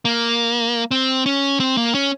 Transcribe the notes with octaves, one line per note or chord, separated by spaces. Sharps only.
A#3
C4
C#4
C4
A#3
C#4